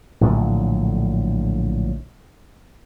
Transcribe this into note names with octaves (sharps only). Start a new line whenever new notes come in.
A#1 A2 D3 F#3